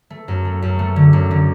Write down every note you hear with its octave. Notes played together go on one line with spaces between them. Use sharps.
A3
F#2
A3
F#2
A3
D3
F#2
D3